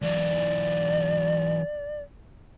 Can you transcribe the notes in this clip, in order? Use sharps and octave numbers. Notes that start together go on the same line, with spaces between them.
E3 F#3 D5